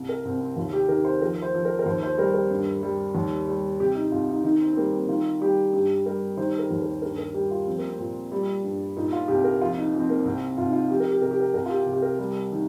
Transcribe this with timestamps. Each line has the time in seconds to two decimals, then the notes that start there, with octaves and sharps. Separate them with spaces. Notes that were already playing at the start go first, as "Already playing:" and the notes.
Already playing: C2
0.09 A#4
0.25 C2 C4
0.41 C4
0.56 D#2 F4
0.73 G4
0.89 D#3 A#4
1.05 C5
1.22 F3 A#4
1.42 C5
1.54 F3
1.65 A#4
1.79 A#4
1.86 D#2 C5
2.03 C5
2.18 G3 A#4
2.34 A#4
2.51 G2
2.83 G3
3.15 D#2
3.48 G3
3.80 C3 G4
3.95 D#4
4.12 C2 F4
4.29 D#4
4.44 D#3 D#4
4.61 C4
4.71 C4
4.77 G3 A#3
4.93 C4
5.08 D#3 F4
5.41 G3 G4
5.73 G2 G4
6.06 G3 A#4
6.37 D#3 C5
6.59 A#4
6.70 D#2
6.82 A#4
7.02 G2 A#4
7.18 A#4
7.34 G3 G4
7.51 F4
7.67 F3 C4
7.78 A#3
7.90 C4
7.99 A#2
8.32 G3
8.63 G2
8.96 A#2 D#4
9.13 F4
9.28 C2 G4
9.44 A#4
9.61 F2 F4
9.78 D#4
9.94 F2
9.99 C4
10.10 A#3
10.25 C2 C4
10.58 C2 F4
10.66 D#4
10.73 F4
10.90 F2 G4
11.00 A#4
11.10 G4
11.22 C3 A#4
11.31 G4
11.40 A#4
11.54 C2 A#4
11.66 F4
11.70 G4
11.86 C3
11.93 G4
12.02 A#4
12.19 G3
12.52 D#3